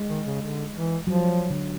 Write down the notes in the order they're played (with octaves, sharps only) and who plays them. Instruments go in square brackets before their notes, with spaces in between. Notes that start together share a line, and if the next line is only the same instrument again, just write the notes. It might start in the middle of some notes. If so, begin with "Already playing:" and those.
Already playing: [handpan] G#3
[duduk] D#3
C#3
D3
E3
[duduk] F3 [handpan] F#3
[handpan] D3